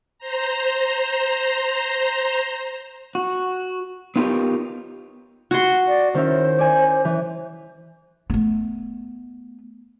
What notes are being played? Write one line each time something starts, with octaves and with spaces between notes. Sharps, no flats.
C5 A#5
F#4
B3 D#4 F4 G4 A#4 C#5
F#4 C6
D5
D#3 C#4 E4 C5
D5 G#5
E3
A3 B3